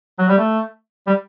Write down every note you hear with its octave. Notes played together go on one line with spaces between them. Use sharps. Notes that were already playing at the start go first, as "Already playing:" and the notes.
F#3
G3
A3
G3